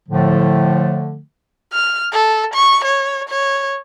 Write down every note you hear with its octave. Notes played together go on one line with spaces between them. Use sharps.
A2 D3 F3 A3
F6
A4
C#6
C#5
C#5